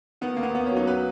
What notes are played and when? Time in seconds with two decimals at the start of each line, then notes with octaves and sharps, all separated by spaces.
0.21 D#3 B3
0.37 D#2 A#3
0.43 B3
0.55 D#2 B3
0.66 C#4
0.71 F#3
0.77 D#4
0.87 F#3 B4